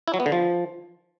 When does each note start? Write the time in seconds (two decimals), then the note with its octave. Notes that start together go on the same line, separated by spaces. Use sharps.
0.08 E4
0.14 F#3
0.20 B3
0.26 D3
0.32 F3